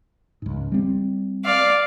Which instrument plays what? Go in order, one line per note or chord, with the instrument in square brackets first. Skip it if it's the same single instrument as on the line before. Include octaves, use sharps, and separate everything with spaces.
[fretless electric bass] C#2 G#2
G3 C4
[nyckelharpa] D5 F5